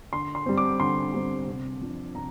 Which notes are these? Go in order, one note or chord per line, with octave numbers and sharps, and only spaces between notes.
D3 C6
C6
G3 C4
D6
D3 C6
G3 C4
C3
F3 D4
C3 A#5